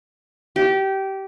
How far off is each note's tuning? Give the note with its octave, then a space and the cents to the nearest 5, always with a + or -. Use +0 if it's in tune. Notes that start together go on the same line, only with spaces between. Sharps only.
G4 -20